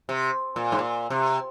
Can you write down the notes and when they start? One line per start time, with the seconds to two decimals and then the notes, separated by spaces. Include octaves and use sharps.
0.09 C3
0.56 A#2
0.72 G#2
0.79 A#2
1.10 C3